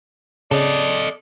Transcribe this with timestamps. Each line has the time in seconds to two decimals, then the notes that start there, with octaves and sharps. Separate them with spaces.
0.51 C#3 A4 D5 D#5